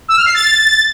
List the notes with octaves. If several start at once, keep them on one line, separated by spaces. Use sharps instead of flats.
E6
F6
C7
A6